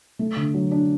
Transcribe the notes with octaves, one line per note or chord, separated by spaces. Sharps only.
A3
D3
F#3
D4